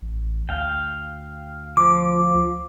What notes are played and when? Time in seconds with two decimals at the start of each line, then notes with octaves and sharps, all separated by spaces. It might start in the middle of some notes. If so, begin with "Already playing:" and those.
0.02 A1
0.49 D2 F5 G5
1.77 F3 D6